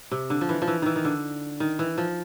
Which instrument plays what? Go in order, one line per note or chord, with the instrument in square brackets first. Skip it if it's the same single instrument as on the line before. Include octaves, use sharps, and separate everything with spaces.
[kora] C3
D3
F3
E3
F3
E3
D#3 E3
D#3
D3
D#3
E3
F3